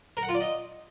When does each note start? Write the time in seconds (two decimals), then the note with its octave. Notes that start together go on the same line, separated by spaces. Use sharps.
0.17 A#4
0.23 F#5
0.29 F4
0.35 D5
0.41 D#5